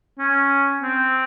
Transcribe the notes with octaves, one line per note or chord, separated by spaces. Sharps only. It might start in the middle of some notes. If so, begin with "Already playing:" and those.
C#4
C4